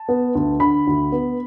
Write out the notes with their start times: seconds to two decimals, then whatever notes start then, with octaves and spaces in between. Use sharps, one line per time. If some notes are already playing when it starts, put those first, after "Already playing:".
Already playing: A5
0.09 B3
0.35 D2
0.60 D3 B5
0.87 D2
1.12 B3